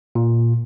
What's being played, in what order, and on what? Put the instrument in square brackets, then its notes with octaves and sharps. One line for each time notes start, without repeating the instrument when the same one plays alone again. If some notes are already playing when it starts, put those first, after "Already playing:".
[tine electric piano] A#2